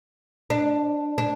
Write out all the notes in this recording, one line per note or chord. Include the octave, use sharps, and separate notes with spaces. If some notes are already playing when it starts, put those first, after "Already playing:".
D4
D4